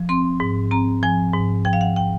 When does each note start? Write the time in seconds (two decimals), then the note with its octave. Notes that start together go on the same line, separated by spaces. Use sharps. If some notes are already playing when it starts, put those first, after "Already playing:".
Already playing: F3
0.09 C4 C6
0.40 G#2
0.71 C4 A#5
1.03 F3 G#5
1.33 G#2
1.65 F3 G5
1.73 F5
1.81 F#5
1.96 G5